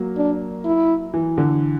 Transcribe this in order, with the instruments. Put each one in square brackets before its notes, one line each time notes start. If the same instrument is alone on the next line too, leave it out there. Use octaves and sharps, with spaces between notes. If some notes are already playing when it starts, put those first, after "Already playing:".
Already playing: [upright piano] F#3 A#3
[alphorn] D4
E4
[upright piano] E3
D3